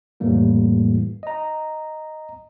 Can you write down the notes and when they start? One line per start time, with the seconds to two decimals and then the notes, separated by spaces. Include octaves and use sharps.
0.20 F2 A2 E3 G3 A#3 E4
1.23 D#5 A#5